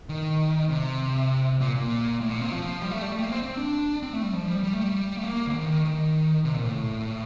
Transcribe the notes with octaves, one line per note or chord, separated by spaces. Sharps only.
D#3
C3
A#2
A#2
A2
A#2
C3
F3
G3
A3
G3
A3
A#3
C4
C4
D4
C4
A3
G3
F3
G3
G3
A3
G3
A3
A#3
D3
D#3
D#3
C3
A#2
A2